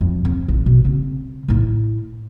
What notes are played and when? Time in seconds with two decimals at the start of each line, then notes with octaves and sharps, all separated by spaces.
0.01 F2
0.25 F2
0.48 A1 F4
0.66 B2
0.85 C#3 C4
1.48 A2 E4